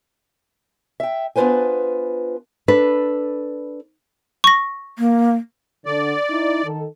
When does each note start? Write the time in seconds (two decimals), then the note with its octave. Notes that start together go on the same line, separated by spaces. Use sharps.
1.00 E5 G5
1.36 B3 D4 F4 B4 C5 G#5
2.68 D4 A4 B4
4.44 C#6 A#6
4.98 A#3
5.86 D3 D5
6.29 D#4 E4
6.64 D#3 A4